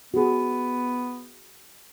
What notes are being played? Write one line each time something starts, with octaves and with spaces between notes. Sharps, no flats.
B3 F#4 G#4